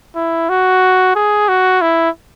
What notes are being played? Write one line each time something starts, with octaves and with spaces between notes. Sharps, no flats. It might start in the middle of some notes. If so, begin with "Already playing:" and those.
E4
F#4
G#4
F#4
E4